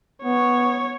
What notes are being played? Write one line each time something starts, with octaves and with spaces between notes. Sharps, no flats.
B3 C#5